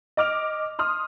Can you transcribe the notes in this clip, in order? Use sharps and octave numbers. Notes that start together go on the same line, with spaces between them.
D#5 D6 F6 F7
C6 D#6 F6